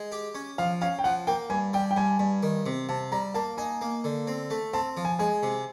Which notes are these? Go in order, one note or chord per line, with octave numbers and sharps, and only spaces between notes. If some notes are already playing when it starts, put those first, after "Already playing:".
Already playing: G#3
G4
C#4
F3 F5
C#4 F5
G5
F3 F#5
A#3 G5
G2 G#5
G3 G5
G5
G2 G#5
G2
D#3
C3
C3 A5
G3 A#5
A#3 A5
D#4 G#5
A#3
D3
C4
A3
C4 A5
F3
G#5
G#3 G#5
C3